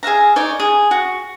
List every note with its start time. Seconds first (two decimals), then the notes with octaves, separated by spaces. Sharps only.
0.03 G#4 E5 F5 A#5
0.36 D#4 C#5 D5
0.60 G#4
0.91 F#4